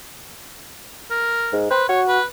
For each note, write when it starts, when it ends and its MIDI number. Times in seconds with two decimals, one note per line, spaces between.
1.11 1.60 70
1.53 1.69 44
1.70 1.87 71
1.70 1.84 72
1.89 2.19 66
1.89 2.01 73
2.08 2.25 71